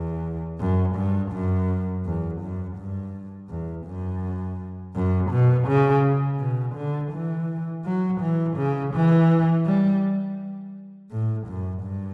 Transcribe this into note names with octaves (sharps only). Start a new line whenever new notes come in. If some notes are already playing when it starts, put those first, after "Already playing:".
Already playing: E2
F#2
G2
F#2
E2
F#2
G2
E2
F#2
F#2
B2
C#3
B2
D3
E3
F#3
E3
C#3
E3
G3
A2
F#2
G2